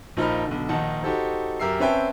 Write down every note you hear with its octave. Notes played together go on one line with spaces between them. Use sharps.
A#1 F3 D#4 A#4 B5 F6
B1 D3
A#1 D#3 D#4 F#5 A5
D#4 F#4 G4 A4 C5
F#2 G4 A#4 E5 E6 C7
C4 C#4 B4 E5 G5 A5